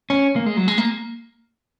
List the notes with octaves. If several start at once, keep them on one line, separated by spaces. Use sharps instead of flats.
C#4
A#3
G#3
F#3
G#3
A#3